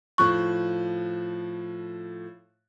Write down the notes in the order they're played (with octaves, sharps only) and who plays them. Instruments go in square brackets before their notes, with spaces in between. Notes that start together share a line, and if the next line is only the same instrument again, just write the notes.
[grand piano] A2 F3 F#6 [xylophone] C#6